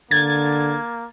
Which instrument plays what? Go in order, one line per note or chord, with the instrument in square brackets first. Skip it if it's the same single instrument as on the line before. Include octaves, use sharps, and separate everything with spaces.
[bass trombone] D3 [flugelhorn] A#3 [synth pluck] G#6 A6